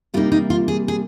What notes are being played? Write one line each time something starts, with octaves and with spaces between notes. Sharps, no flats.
C3 G3 A#3 D#4 F4
D#4
F4
G#4
G#4